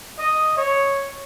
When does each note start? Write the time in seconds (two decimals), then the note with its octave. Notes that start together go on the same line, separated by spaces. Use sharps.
0.19 D#5
0.57 C#5